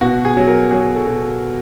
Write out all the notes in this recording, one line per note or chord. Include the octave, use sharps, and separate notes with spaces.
B2 F#4
G#4
F#3
A#4
F#3 G#4
A4
B2